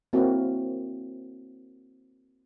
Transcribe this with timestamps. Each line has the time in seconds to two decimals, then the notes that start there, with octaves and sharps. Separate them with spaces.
0.13 A#3 C4 E4 F#4